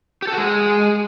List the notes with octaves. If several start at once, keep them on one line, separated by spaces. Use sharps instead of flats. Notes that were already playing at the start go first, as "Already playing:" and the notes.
G4
A4
F#4
G#3